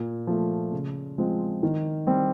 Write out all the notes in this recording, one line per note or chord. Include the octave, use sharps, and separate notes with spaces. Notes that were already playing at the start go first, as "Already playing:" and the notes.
Already playing: A#2
F3 A3
C#3
F3 G#3 C4
D#3
G3 C4